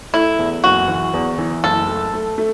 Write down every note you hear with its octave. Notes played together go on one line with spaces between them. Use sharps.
A3 E4
E2
F#1 F#4
E3
E2
E3
F#1 A4
A3
A3
A3